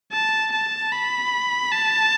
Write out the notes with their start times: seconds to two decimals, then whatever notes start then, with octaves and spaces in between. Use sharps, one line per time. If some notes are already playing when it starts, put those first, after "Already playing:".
0.12 A5
0.53 A5
0.92 B5
1.72 A5